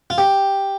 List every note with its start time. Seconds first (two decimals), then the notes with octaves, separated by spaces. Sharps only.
0.10 F4
0.18 G4